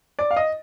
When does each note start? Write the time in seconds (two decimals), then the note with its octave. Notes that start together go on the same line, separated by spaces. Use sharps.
0.19 D5
0.31 F5
0.36 D#5